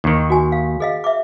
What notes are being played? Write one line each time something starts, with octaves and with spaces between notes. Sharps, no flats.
D#2 D#3
F#4 G#5
F5
G#4 D#5 F5
E5 D6